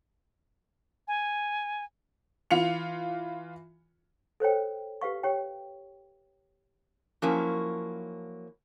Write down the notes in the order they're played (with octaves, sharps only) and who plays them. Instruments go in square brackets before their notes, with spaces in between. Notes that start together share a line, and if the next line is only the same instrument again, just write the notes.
[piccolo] G#5
[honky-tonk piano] E3 F4 C#7 F7
[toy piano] A4 C5 C#5 G5
G4 B4 F5 C#6
G4 C#5 G5
[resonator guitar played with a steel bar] F3 F#3 A#3 C#4 E4